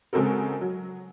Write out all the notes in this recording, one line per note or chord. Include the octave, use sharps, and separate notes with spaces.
C#3 G#3 C4 F#4 A4 A#4
F#3